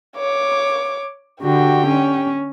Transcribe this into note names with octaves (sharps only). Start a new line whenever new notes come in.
C#5 D6
D3 F#4 G4 G5
C#4